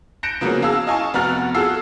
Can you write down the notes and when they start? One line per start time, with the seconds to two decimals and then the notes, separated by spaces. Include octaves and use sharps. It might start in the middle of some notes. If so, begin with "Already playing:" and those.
0.23 F#6 G6 A#6 C#7 D7 E7
0.41 C#3 F3 F#3 A#3 B3 C#4
0.62 G#4 F5 A5 E6
0.87 D#5 F5 G#5 A5 C#6
1.14 F1 B3 F#4 A#5 F6 A6
1.54 F4 F#4 G#4 A4 E6 C7